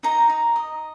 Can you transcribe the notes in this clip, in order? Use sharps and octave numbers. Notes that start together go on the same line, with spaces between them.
D#4 A#5
D#4
D#5